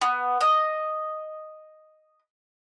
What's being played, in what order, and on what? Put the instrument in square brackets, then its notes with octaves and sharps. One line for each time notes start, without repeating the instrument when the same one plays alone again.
[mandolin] B3
D#5